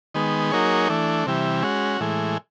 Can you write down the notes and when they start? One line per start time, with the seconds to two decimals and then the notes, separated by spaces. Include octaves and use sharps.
0.14 D#3 G#3 B3
0.51 F#3 A#3 D#4 G#4 C#5
0.89 E3 A3 D4
1.26 C3 E3 G3
1.62 G#3 C#4 F#4
2.00 A2 E3 G#3